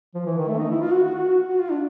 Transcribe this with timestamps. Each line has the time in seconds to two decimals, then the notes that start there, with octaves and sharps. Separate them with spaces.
0.15 F3
0.26 E3
0.37 D#3
0.48 A3
0.59 D#4
0.71 E4
0.82 F4
0.93 F#4
1.04 F#4
1.15 F#4
1.49 F#4
1.60 F4
1.71 D4